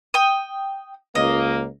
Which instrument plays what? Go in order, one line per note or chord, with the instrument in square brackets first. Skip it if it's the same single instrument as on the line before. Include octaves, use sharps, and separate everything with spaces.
[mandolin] G5 D#6
[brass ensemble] C#2 A#3 [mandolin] D#5